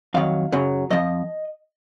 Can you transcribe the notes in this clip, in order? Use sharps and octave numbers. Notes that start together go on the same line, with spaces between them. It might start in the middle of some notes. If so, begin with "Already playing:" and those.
F2 D#3 F#3 F5
F#2 C#3 F#3
F2 F3 D#5